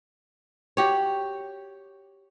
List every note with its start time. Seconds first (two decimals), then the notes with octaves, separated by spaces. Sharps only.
0.77 F#4 G4 C#5